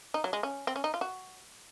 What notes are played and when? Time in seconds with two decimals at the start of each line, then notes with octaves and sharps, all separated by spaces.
0.14 D#4
0.24 F#3
0.33 G#3
0.43 C#4
0.67 C4
0.76 C#4
0.84 D#4
0.94 F4
1.01 F#4